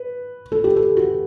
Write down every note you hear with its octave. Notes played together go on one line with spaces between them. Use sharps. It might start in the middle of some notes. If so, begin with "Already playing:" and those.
Already playing: B4
A4
G4
A4
F#4